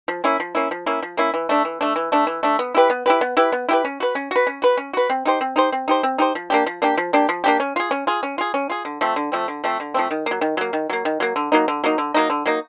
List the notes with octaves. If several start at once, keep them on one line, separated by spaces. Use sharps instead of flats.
F3
A#3 C#4 E4
F3
A#3 C#4 E4
F3
A#3 C#4 E4
F3
A#3 C#4 E4
E3
A3 D4
E3
A3 D4
E3
A3 D4
E3
A3 D4
B3
E4 G4 B4
B3
E4 G4 B4
B3
E4 G4 B4
B3
E4 G4 B4
C#4
F#4 B4
C#4
F#4 B4
C#4
F#4 B4
C#4
F#4 B4
C4
D#4 G4 C5
C4
D#4 G4 C5
C4
D#4 G4 C5
C4
D#4 G4 C5
F3
A#3 D4 G4
F3
A#3 D4 G4
F3
A#3 D4 G4
F3
A#3 D4 G4
C#4
F4 G#4
C#4
F4 G#4
C#4
F4 G#4
C#4
F4 G#4
D3
F3 A3 C4
D3
F3 A3 C4
D3
F3 A3 C4
D3
F3 A3 C4
D#3
F#3 A#3
D#3
F#3 A#3
D#3
F#3 A#3
D#3
F#3 A#3
D3
F#3 A#3 D#4
D3
F#3 A#3 D#4
D3
F#3 A#3 D#4
D3
F#3 A#3 D#4